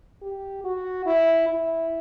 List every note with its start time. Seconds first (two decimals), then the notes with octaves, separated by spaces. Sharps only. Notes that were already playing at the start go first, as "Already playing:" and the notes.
0.22 G4
0.64 F#4
1.06 E4
1.48 E4